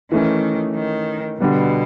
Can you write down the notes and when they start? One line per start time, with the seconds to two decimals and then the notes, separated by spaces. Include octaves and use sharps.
0.12 D#3 E3 A3 C#4
0.75 D#3
1.40 B2 D3 G3 B3